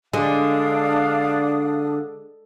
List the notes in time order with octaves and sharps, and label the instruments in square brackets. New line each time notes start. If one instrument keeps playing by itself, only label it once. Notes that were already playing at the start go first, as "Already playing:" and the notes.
[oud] D3 [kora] G#3 [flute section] D4 D#6 [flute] F5